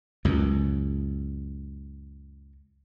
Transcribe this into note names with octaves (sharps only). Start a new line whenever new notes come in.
C#2 F#2